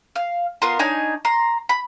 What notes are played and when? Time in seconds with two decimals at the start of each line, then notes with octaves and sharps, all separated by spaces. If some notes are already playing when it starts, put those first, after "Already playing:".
0.16 F5
0.62 B3 F4 A#4 C6
0.79 D4 D#4 C#5 G#5
1.25 A#5 C6
1.69 B5